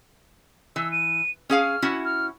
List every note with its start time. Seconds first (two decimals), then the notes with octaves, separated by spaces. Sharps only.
0.76 E3 E6
0.92 D#7
1.50 C#4 G#4 F5 F6
1.82 C#4 E4 F#4
2.05 F6